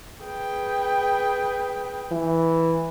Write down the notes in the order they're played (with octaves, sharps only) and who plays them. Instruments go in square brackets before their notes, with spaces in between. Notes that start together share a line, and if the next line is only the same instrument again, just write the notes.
[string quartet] G#4 B4 G5
[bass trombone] E3